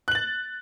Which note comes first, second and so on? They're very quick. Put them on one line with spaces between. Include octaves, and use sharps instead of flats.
F#6 F#7 A6